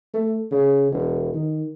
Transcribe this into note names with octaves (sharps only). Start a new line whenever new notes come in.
A3
C#3
E1
D#3